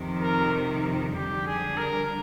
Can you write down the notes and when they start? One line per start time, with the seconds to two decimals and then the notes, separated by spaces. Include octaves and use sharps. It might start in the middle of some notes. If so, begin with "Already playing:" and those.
Already playing: F2 C3 D#3
0.22 A#4
1.15 F2 D3 G3 D4 G4
1.46 G#4
1.77 A#4